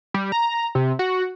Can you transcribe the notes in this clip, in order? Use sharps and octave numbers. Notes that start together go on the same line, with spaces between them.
G3
A#5
C3
F#4